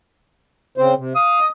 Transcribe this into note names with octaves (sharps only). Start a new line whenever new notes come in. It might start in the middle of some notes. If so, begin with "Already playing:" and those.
C#3 C4 C5
C3
F5 D#6
D#5